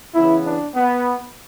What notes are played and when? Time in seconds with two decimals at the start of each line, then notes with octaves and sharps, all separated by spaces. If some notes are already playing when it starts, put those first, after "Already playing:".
0.14 C#3 E3 B3 E4
0.45 D4
0.75 B3